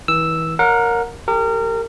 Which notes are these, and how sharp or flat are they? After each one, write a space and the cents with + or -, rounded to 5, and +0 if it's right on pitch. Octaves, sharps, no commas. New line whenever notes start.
E3 -35 E6 +0
A#4 +0 C#5 +15 F#5 -35
G4 +25 A#4 -30